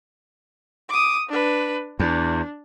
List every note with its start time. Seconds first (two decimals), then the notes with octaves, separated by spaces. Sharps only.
0.89 D6 D#6
1.29 D4 B4
2.00 E2 D4